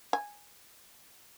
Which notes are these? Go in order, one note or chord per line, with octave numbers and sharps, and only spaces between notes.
G#5